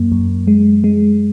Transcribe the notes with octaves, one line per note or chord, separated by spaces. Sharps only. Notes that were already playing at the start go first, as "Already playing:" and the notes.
Already playing: F#2 A#3
F#2
G#3
G#3